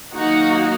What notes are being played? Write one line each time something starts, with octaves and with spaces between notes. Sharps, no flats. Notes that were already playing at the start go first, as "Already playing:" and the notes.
D#3 F#3 A#3 D#4 F#4